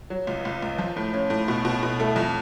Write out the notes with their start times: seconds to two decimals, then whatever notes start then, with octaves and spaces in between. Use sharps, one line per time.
0.10 F#3
0.27 C#2
0.45 C#2
0.62 C#2
0.78 F3
0.96 A2
1.13 C#4
1.30 A2
1.48 B2
1.65 B2
1.83 B2
2.00 A3
2.16 F2